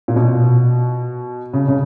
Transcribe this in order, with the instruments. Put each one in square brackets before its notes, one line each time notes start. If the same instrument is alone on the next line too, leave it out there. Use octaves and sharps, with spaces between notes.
[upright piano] A#2
B2
C#3
C#3